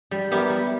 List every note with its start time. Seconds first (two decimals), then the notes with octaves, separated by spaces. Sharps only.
0.11 G3
0.31 B3 E4 G4 A#4
0.50 G3